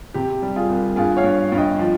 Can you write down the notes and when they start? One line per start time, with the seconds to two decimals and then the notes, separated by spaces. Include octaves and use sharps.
0.14 C3 G4
0.43 G3
0.56 F4 G#4
0.70 C2
0.96 G2 F4 G#4
1.17 C#5 F5
1.23 G2
1.52 G2
1.58 D#5 G5
1.79 F3